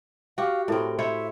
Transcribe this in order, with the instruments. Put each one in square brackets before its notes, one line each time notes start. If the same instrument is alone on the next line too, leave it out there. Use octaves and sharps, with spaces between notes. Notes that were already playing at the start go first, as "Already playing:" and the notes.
[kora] F#4 G4 [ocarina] F5
[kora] A2 C4 [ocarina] A#4
[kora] E4 C5 C#5 [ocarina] E5